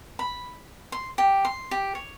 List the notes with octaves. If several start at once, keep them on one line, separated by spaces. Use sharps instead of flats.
B5
C6
G4
C6
G4
C#5